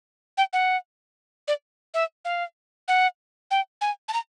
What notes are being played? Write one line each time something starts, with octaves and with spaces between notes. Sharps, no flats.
G5
F#5
D5
E5
F5
F#5
G5
G#5
A5
A#5